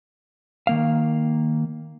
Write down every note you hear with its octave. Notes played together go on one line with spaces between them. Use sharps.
D#3 A#3 F5